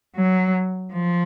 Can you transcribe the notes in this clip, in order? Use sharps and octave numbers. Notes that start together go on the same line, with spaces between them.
F#3
F3